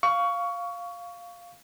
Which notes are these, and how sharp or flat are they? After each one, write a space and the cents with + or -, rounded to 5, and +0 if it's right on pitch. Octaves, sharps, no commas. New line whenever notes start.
F5 +0 C#6 +20